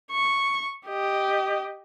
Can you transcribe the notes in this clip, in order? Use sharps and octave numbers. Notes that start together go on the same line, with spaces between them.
C#6
G4 D#5